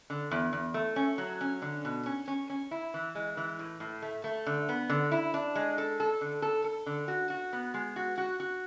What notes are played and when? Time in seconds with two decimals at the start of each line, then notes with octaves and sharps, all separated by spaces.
0.10 D3
0.31 E2
0.53 E2
0.74 A3
0.96 C#4
1.18 F#3
1.41 C#4
1.62 D3
1.85 B2
2.06 C#4
2.28 C#4
2.50 C#4
2.71 E4
2.94 E3
3.15 G#3
3.37 E3
3.59 A2
3.80 A2
4.02 A3
4.24 A3
4.46 D3
4.69 B3
4.89 D3
5.12 E4
5.34 D4
5.55 G#3
5.78 A4
6.00 A4
6.21 D3
6.42 A4
6.64 A4
6.86 D3
7.08 F#4
7.30 F#4
7.53 B3
7.74 G#3
7.96 F#4
8.18 F#4
8.40 F#4